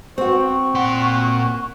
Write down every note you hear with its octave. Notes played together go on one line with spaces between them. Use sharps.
C4 F#4 C5 C#6
A#2 F#5 C6